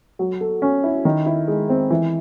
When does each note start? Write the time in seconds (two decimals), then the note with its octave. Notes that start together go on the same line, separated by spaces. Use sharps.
0.19 F#3
0.41 A4
0.62 C#4
0.84 E4
1.05 D#3
1.26 E4
1.48 G#3
1.70 C4
1.91 E3